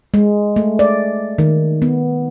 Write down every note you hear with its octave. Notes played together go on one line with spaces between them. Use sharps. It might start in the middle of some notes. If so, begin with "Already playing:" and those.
G#3
A3
D5
D#3
B3